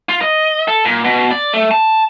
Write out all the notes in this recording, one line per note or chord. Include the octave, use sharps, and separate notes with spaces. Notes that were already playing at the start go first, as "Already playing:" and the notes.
F4
D#5
A4
A#2
B2
D5
A3
A5